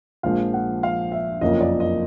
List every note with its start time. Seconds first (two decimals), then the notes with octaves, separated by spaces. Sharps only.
0.23 A#1 A#2 F3 G#3 F5
0.54 F#5
0.83 F5
1.12 E5
1.41 F#1 F2 C#3 F3 A#3 D#5
1.61 D5
1.80 D#5